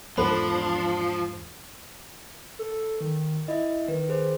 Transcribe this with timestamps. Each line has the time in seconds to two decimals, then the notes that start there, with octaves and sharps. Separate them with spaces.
0.17 E2 G#2 F3 B3 D4 A4 C5 B5
2.59 A4
3.01 D#3
3.48 E4 D#5 E5
3.88 D#3 B4
4.09 G#4 C5